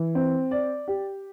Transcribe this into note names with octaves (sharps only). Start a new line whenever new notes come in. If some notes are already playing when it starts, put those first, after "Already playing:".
Already playing: E3
C4
D5
G4